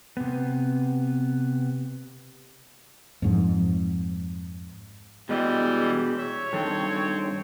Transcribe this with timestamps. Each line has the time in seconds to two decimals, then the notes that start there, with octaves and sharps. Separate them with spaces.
0.17 C3 B3
3.22 F2 G#2 F3
5.29 B2 E3 G3 G#3 D#5
6.18 C#5 E5
6.53 G2 D#3 C4 A4